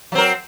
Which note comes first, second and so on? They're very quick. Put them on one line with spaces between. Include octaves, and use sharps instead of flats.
F#3 C4 A#4